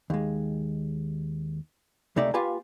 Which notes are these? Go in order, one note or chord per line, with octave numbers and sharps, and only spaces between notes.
D#2 G#3
C#2 C3 A3 D#4 D5 E5
A#3 F4 G4 B4 F5 G#5